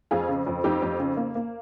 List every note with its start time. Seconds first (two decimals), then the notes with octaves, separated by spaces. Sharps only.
0.11 F2 F4 G#4
0.29 C#3
0.46 F2
0.64 F2 D#4 G4
0.82 F2
1.00 C#3
1.17 A#3
1.35 A#3